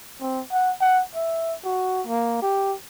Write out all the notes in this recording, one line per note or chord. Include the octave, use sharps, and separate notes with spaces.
C4
F#5
F#5
E5
F#4
A#3
G4